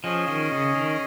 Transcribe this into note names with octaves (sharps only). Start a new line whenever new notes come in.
F3 C#4 G#4 D#5 G#5
D#3
C#3
D#3